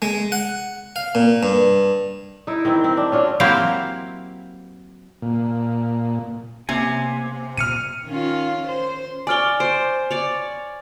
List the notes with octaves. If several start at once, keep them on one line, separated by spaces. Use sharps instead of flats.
G#3
F#5
F5
A#2
G2
D#4 E4
D#3 E3 C4
C4
D4
C#4 D4 F4 F#4
F#3 A#3 C4 E4 G4 F5
A#2
C3 A#3 B3 C#4 G#5
A#2 F6 C#7 D#7
D#3 C#4 F4
C5
C#5 D5 G#5 F6 G7
C5 D7
C#5 D5